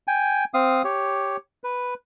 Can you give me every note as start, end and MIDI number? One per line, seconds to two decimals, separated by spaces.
0.08 0.44 79
0.08 0.44 80
0.54 0.82 60
0.54 0.82 77
0.54 0.82 87
0.84 1.37 67
0.84 1.37 73
1.64 1.94 71